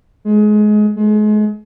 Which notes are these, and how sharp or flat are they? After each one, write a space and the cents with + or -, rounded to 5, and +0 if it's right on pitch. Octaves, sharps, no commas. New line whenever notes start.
G#3 +25
G#3 +35